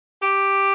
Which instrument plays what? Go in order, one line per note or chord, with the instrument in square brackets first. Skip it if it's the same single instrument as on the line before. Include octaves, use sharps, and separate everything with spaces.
[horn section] G4